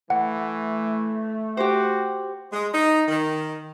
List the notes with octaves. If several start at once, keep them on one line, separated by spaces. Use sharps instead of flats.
E3 A3 F#5
F#4 G4 C5
G#3
D#4
D#3